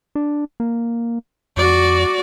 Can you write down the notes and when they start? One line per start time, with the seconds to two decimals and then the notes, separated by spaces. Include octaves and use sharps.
0.15 D4
0.60 A#3
1.57 F2 F#4 D5